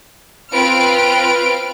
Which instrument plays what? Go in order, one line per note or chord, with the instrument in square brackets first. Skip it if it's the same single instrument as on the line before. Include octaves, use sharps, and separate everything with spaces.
[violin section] C4 F4 B4 F6 D7